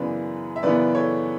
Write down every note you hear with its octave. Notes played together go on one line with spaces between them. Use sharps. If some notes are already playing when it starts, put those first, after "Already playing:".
Already playing: F#2 C#3 E3 B3 B4 D5
E5
F#2 C#3 E3 B3 B4 D5
A4 C#5